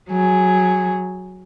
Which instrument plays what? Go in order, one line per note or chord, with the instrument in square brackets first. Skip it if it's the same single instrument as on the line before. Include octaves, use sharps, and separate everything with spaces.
[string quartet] F#3 G#4